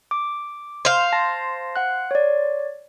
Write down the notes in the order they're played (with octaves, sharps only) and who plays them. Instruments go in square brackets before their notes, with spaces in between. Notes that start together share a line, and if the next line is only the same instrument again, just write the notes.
[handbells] D6
[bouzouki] C5 F5
[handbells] A5 A#6
F#5 F#6
C#5 D5